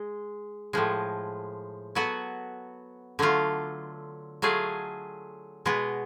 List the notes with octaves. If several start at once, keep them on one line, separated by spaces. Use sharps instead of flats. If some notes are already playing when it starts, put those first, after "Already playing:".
Already playing: G#3
A2 F3 G#3
F#3 B3 F#4 A4
D3 F#3 A3 F4
F#3 A3 F4 G#4
B2 G#3 B3